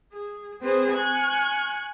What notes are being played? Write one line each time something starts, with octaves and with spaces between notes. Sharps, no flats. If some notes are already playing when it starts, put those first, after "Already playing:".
G#4
C4 G#4 B4 C5
G#5 C#6 F#6